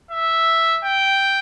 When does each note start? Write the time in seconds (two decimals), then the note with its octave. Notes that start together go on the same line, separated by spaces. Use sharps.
0.11 E5
0.85 G5